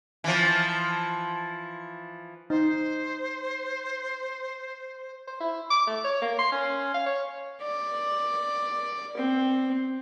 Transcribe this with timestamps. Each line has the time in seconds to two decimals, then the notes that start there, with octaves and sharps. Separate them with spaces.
0.24 E3 F3
2.50 D#4 C5
5.27 C5
5.41 E4
5.70 D6
5.87 A3
6.04 C#5
6.22 A#3
6.39 C6
6.52 C#4
6.94 F5
7.06 C#5
7.61 D5
9.17 C4